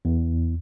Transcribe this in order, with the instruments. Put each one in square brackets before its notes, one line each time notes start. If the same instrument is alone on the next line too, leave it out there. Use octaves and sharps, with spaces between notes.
[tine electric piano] E2